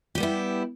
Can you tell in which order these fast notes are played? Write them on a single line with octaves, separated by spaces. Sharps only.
G4 G3 B3 E4